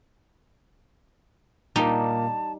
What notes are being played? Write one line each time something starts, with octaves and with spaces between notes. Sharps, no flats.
A#2 G3 A#3 D#4 G4 A5